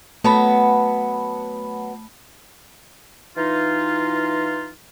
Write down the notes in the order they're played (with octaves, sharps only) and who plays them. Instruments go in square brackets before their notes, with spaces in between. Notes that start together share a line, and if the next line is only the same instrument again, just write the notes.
[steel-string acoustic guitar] F#3 B3 [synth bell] A3 A5 B5
[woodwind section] E3 D#4 F4